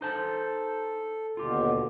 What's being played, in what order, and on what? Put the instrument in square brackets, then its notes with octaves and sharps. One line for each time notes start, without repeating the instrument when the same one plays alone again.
[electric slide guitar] D#4 C5 A5 [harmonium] A4
[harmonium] D#2 B2 D3 [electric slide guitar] F4 G4